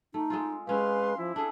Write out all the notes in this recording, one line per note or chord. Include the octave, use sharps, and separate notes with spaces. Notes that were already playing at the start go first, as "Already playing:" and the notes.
A3 D#4
G#3 C4 F4
G#3 C4 C#4 G4 B4 F5 C6
F3 E4
D4 G#4 A4